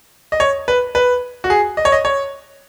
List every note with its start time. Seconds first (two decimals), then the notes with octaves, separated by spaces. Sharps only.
0.32 D#5
0.40 C#5
0.68 B4
0.95 B4
1.44 F#4
1.50 G#4
1.77 D#5
1.85 C#5
1.92 D#5
2.05 C#5